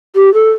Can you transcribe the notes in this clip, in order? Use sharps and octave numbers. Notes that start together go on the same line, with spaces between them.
G4
A4